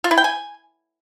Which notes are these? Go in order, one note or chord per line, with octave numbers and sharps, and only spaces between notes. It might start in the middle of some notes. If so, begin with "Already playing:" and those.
F4
E4
G5
G#5